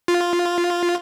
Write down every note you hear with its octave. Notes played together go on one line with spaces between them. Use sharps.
F4